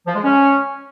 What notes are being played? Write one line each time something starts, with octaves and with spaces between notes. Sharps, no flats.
F3
G#3
C#4